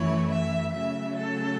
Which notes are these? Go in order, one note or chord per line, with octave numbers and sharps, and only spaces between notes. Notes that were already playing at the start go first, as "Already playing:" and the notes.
Already playing: F#2 E3 A3 E4 C#5
E5
C#3 F#3 A3 E5
A4